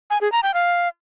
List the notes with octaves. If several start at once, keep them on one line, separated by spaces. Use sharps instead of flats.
G#5
G#4
A#5
G5
F5